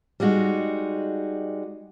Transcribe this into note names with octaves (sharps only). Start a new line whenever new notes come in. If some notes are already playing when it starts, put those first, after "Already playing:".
G3 G#3 D#4 F#4